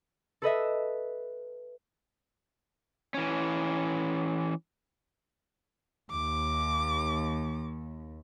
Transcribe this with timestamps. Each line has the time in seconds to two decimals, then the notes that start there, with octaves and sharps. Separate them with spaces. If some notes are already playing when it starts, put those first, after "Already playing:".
0.42 A4 B4 D#5 E5
3.14 E3 C#4
6.11 D#2 D6